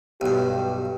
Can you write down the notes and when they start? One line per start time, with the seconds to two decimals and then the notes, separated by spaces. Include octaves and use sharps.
0.21 B1 G2 G4